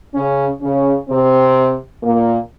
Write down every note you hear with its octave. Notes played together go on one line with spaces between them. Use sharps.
C#3 C#4
C#3 C#4
C3 C4
A#2 A#3